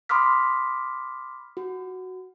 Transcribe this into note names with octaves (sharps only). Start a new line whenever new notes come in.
B5 C6 D6 D#6 F6 B6
F#4